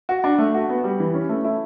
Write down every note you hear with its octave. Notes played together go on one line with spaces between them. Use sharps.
F#4
D4
A3
F#4
B3
G3
E3
C#4
A3
E4